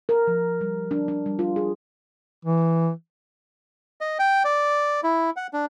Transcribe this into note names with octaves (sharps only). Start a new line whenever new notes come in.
A#4
F3
G3
D4
D4
G3
F4
G#4
E3
D#5
G5
D5
E4
F#5
D4